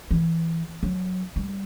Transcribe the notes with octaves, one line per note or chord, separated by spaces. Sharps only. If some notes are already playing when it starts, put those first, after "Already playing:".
E3
F#3
G3